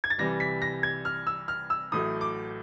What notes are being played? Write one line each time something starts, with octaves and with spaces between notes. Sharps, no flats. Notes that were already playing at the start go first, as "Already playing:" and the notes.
G#6
A6
C2 C3 E3 G3 A#6
B6
A#6
G#6
F6
E6
F6
E6
A1 A2 F#3 A3 D#6
D6